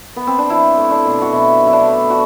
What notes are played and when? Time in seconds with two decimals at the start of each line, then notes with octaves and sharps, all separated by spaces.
0.16 B3
0.27 C4
0.39 D4
0.50 F#3 E4
0.77 A3
0.91 D4
1.05 B2
1.21 F#4
1.33 B2 E4
1.60 F#3
1.67 E4
1.73 D4
1.87 A3
2.10 F#4